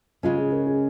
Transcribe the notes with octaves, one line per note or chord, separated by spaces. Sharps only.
C#3 G#3 C#4 F4
G#4
A#4
G#4